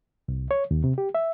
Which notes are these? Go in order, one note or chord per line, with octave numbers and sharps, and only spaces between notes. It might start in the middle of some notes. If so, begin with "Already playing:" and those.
C2
C#5
D#2
C3
G4
E5